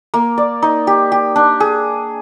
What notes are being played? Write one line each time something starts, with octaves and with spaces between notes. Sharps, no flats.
A#3
D5
D#4
G4
G4
D4
G#4